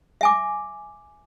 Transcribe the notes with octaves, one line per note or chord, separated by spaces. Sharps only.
E5 G#5 D6